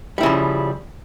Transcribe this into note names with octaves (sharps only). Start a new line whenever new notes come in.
C#3 F3 G3 E4